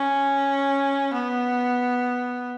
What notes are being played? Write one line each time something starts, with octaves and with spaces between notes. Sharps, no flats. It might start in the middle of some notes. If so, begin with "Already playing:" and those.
Already playing: C#4
B3